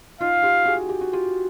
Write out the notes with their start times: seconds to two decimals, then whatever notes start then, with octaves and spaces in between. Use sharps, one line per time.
0.21 D#4 F4 F5
0.43 F4 G4
0.65 F#4 G#4
0.89 G4
1.01 F#4
1.13 F4 G4